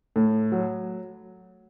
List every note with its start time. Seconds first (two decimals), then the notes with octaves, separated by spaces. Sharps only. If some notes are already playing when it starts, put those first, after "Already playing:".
0.16 A2
0.52 F#3